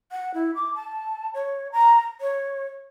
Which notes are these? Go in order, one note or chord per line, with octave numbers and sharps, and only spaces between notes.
F#5
E4
D6
A5
C#5
A#5
C#5